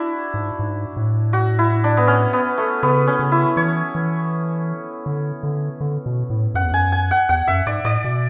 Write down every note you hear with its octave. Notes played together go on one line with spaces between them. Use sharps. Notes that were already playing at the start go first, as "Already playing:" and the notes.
Already playing: D4 E4 F#4
G#2
G#2
A2
F#4
E4
D4
B3
C#4
B3
A3
C#3 B3
C#4
C#3
E4
E3 C#5
E3
D3
D3
D3
B2
A2
F#2 F#5
E2
F#2 G#5
G#5
F#5
E2 F#5
F#2 E5
G#2 D5
A2 D5
B2